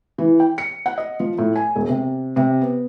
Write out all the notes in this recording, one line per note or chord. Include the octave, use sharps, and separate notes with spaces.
E3
G5
C#7
F#5
D#5
F3
A2
G#5
E1
C3
C3
B3